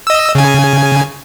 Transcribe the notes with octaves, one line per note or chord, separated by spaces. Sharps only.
D#5 E6
C#3 G#5